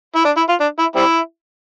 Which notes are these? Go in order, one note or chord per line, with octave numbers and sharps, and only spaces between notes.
E4
D4
E4
F4
D4
E4
G3 C4 E4